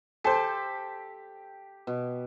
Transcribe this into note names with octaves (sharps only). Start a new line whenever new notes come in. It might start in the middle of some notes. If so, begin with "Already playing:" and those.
G4 A4 C5
B2